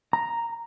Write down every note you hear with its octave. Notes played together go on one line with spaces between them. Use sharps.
A#5